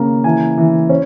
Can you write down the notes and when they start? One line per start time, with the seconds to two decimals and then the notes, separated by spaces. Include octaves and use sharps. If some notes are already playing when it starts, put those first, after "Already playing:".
Already playing: C#3 A#3
0.24 E3 G#5
0.58 E3
0.89 C#4